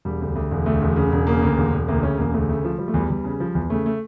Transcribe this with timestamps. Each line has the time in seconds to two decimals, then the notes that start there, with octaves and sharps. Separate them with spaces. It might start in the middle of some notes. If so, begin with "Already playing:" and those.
0.05 E1 G3
0.21 D2
0.35 D2
0.51 E1
0.66 D2 A3
0.82 E1
0.96 C#3
1.12 E1
1.27 C#3 A#3
1.42 D2
1.58 E1
1.73 E1
1.88 D2 A#3
2.03 C#3 C#4
2.18 E1 A#3
2.33 D2 A3
2.49 C#3 A3
2.65 F3
2.79 F3 G3
2.88 A3
2.94 E2 G3
3.10 E2 G3
3.24 C#3
3.40 F3
3.55 E2
3.70 C#3 A3
3.86 A3